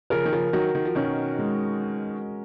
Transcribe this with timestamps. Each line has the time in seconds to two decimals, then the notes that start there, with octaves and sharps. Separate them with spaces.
0.10 C#3 F3 A#4
0.26 D#3
0.32 C#3 F3
0.53 D#3 F#3 F#4
0.75 D#3
0.85 F3
0.95 B2 D#3 C#4
1.39 G#3